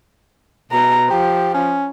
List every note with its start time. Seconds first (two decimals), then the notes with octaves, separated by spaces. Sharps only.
0.72 B2 A#5
1.10 F3 G4
1.54 C#4